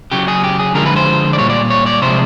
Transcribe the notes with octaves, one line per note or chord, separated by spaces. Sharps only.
C#3 F#3 G4
G#4
G4
G#4
D3 F3 G#3 A#4
B4
C5
D5
A#2 G3 C#5
D5
C#5
D5
C3 F3 G#3 C5